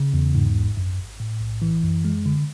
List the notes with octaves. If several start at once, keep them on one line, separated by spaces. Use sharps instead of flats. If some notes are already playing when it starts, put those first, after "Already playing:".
Already playing: C#3
E2
G#2
A1
F#2
G#1
A2
B1
E3
F#2
G#3
D3